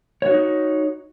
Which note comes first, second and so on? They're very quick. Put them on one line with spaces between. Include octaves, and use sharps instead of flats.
C#5 F#4 D#4